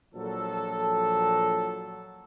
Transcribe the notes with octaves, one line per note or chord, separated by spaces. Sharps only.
A#1 F3 F#3 A4